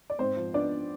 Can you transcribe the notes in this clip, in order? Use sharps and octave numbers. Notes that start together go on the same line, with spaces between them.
D5
G#2 C4 C5
F3
B3 D4 D5